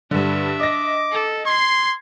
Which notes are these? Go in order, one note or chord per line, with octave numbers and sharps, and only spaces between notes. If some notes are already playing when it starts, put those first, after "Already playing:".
G2 D3 D4 E5
D#5 D6 A#6
A4
C6 G#6 C7